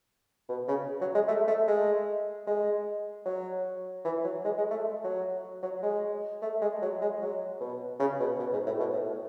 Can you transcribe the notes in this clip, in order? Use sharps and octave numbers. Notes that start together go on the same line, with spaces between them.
B2
C#3
F#3
G#3
A3
A3
G#3
G#3
F#3
E3
F#3
G#3
G#3
A3
F#3
F#3
G#3
A3
G#3
F#3
G#3
F#3
B2
C#3
B2
B2
G#2
A2
B2
A2